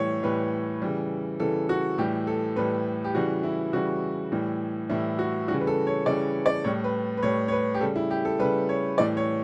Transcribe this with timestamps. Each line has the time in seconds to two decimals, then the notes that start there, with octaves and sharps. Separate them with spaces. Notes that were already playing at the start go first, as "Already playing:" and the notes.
Already playing: A2 E3 G3 C#5
0.23 A2 E3 G3 B4
0.82 C#3 E3 G3
1.40 C#3 E3 G3 A4
1.69 F#4
1.98 A2 E3 G3 G4
2.27 A4
2.56 A2 E3 G3 B4
3.04 G4
3.14 C#3 E3 G3 F#4
3.43 E4
3.73 C#3 E3 G3 F#4
4.32 A2 E3 G3
4.89 A2 E3 G3 E4
5.19 F#4
5.48 C#3 E3 G3 F#4
5.60 B4
5.67 A4
5.87 C#5
6.06 C#3 E3 G3 D5
6.46 D5
6.64 A2 G3 C#5
6.84 B4
7.17 B4
7.23 A2 G3 C#5
7.48 C#5
7.52 B4
7.74 G4
7.81 C#3 G3 A4
7.96 E4
8.11 G4
8.25 A4
8.39 C#3 G3 B4
8.69 C#5
8.98 A2 E3 G3 D5
9.17 C#5